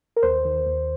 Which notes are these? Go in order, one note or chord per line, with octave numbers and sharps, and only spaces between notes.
A#4
D#2 C5
D#3
D#2